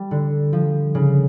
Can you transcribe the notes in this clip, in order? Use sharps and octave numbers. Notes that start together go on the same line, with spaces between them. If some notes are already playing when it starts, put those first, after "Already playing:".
Already playing: G3
D3
F3
C#3